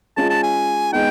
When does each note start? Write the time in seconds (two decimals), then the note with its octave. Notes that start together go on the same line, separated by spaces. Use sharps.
0.17 G#3 C#4 F4 G#4 A5
0.30 A5
0.43 G#5
0.92 G#3 B3 D#4 G5